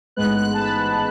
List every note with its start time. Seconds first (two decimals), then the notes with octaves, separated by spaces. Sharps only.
0.16 A1 G#2 G#3 B3 F#6
0.38 F#6
0.54 A5
0.60 B5